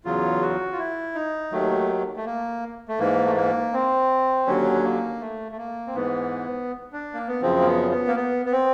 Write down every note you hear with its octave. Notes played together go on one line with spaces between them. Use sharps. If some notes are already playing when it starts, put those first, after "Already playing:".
E2 C#3 F#3 F4
F#4
F4
E4
D#4
D#2 D#3 F#3 A3
A3
A#3
A3
G#2 E3 A#3
A3
A#3
C4
D#2 D3 F#3 C#4
A#3
A3
A3
A#3
C4
G#2 E3 B3
D4
A#3
B3
F#2 C#3 F3 C4
A#3
B3
B3
A#3
B3
B3
C4